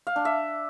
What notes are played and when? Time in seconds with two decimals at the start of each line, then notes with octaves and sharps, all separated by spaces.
0.07 F5
0.16 D4
0.25 E5